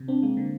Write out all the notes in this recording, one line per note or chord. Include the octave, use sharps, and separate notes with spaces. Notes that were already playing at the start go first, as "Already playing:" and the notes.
Already playing: C3
C4 D4
G#3 A#3
D3